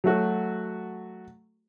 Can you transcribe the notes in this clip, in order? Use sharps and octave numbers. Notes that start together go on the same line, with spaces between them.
F#3 A3 F#4 A4